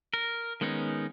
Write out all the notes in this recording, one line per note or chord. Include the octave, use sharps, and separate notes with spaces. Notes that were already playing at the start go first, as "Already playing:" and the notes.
A#4
D#3 G#3 B3 C#4 D#4